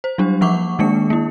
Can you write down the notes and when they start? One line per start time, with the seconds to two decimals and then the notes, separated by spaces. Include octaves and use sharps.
0.04 C5
0.18 F#3 G3 D4 G4
0.41 F3 A#3 F#5 C#6 D6
0.79 D#3 G#3 A#3 D4 C#7
1.10 A#3 E4